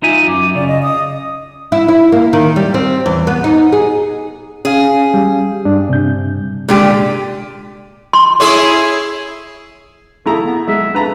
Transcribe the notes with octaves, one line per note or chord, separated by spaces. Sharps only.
D#4 F4 E5 G#5
F#2 D6
C#3 D5
D#5
D#6
E4
E4
A#3
D#3
G3
C4
E2
B3
D#4
G#4
C#4 G#4 F5
G3
G2 D4
C3 G6
A#2 D3 G#3 G4
C6
C#4 E4 G#4
A3 E4 G#4 A#5
B3
G#3 E5
D4 B4 A#5